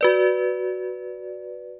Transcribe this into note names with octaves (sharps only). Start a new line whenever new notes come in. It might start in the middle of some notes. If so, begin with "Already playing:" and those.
F#4 B4 D5